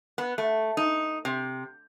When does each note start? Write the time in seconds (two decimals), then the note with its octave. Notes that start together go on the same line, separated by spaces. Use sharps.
0.18 B3
0.38 A3
0.77 D#4
1.25 C3